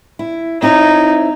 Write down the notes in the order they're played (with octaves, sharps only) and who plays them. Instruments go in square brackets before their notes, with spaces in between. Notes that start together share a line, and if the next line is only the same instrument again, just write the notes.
[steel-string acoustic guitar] E4
[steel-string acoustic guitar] C4 E4 C#5 [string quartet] D#4